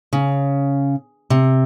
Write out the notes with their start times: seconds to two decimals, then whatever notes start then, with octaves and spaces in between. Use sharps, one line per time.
0.13 C#3
1.30 C3